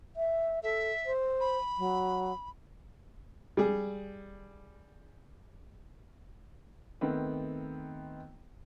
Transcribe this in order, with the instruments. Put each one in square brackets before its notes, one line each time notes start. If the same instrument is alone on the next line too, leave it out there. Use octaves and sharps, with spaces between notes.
[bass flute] E5
[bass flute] A4 [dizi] E5
[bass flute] C5
[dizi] B5
[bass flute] F#3
[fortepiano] G3 G#4
[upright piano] D#3 A3 B3 C4